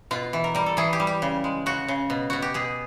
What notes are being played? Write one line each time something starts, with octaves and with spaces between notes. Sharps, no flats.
B2 F4
E3
A#4
G3 A#4
A4
E3 G#4
G4
G3
G4
C#3
G#3
C#3 F#4
C#3
B2
B2 F#4
G4
B2 G#4